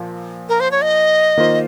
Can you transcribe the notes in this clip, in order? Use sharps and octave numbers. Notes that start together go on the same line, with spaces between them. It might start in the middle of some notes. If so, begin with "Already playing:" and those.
Already playing: A#2 F3
A#4
C5
C#5
D#5
D#3 A#3 F4 C5